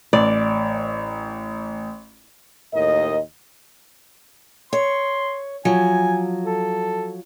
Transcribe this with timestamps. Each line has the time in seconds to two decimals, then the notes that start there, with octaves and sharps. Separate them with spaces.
0.13 A1 D5
2.74 D#2 A2 A#4 D#5
4.73 C#5 C6
5.65 F3 F#3 G#5
6.44 A4